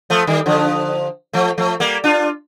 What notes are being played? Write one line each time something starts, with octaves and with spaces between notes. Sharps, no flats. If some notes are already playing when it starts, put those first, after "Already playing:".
F3 A3
D#3 G3
D3 F3
F3 A3
F3 A3
G3 A#3
D4 F4